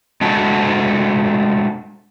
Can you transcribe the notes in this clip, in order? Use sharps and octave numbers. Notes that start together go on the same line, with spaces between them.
G#3 A3 D4 F#4 A4